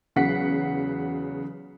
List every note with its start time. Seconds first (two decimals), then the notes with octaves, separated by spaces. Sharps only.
0.16 E2 C#3 F#3 F#5 B6 C7